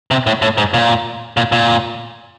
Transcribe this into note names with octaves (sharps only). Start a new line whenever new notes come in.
C3
A2
A2
G#2
A#2
A#2
A#2